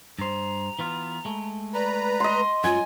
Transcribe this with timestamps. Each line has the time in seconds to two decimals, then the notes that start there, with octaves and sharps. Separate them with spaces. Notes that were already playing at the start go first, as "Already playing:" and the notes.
0.19 G2 C5 A#5
0.79 E3 B3 F4
1.25 G#3 A3
1.74 B4 D5 A#5
2.20 D#5 C6
2.64 F#2 F#3 G#3 F4 G#5